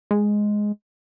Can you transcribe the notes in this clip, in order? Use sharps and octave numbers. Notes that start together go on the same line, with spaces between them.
G#3